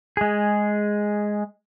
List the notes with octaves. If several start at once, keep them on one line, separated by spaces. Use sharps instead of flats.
G#3 G#4